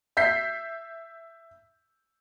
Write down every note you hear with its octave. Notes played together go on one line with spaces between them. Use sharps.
E5 G6 B6 C7